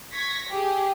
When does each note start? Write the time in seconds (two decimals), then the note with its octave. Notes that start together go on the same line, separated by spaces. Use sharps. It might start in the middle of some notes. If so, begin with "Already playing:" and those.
0.11 C#6 G#6 A#6 B6
0.49 G4 G#4